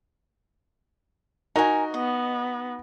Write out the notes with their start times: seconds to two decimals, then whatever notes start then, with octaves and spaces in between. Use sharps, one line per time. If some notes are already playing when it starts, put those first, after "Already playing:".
1.56 D#4 F#4 A#4 G#5
1.94 B3 D#5